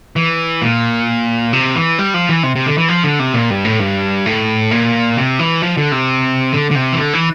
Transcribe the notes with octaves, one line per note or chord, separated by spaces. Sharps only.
E3
A#2
C3
E3
G3
F3
E3
C3
C3
D3
E3
F3
D3
C3
A#2
G2
A2
G2
A2
A#2
C3
E3
F3
D3
C3
D3
D3
C3
E3
D3
E3